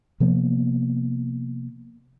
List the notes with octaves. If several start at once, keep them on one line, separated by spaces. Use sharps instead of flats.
C3 F3 A#3 B3